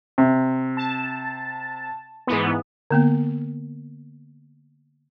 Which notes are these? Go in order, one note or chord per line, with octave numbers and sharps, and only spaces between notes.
C3
A5
G#2 E3 B3
D3 A#3 B3